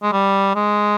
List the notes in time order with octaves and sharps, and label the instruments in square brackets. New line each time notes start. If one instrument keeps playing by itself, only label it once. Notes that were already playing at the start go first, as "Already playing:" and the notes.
[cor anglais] G#3
G3
G#3